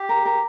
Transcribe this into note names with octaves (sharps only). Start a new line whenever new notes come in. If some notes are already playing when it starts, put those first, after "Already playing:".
Already playing: G4
A#4
A#4